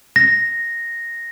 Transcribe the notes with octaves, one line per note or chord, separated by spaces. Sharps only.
A#6